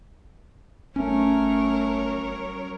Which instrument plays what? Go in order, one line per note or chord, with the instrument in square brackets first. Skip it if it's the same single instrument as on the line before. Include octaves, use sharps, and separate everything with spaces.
[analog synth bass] G1 [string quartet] F#3 A#4 C#5 [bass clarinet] A3 [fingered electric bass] C#4